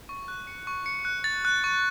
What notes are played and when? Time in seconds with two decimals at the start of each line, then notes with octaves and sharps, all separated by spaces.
0.09 C#6
0.28 F#6
0.47 C#7
0.67 C#6
0.86 C#7
1.05 F#6
1.24 A6
1.45 F#6
1.64 C#6